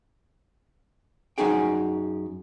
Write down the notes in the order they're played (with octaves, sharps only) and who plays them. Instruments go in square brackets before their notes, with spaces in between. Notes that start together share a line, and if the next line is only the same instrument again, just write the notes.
[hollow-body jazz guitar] F#2 C#4 D#4 G#4 G5